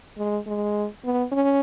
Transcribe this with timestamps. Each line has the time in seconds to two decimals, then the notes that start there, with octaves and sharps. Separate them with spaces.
0.18 G#3
0.47 G#3
1.05 B3
1.32 C#4